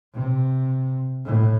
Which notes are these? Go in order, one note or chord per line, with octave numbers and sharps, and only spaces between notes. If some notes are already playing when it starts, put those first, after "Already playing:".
C3
A2